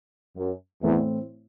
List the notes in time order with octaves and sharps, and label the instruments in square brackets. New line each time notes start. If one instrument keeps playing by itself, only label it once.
[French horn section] F#2
[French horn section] E2 [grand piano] A2 E3 A3 C4 E4